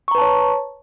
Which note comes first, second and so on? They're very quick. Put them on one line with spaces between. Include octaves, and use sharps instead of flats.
C#6 A#5 B4 A5 C#5